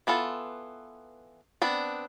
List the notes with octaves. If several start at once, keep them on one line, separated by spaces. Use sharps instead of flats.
E3 B3 F4 A4
B3 C4 D4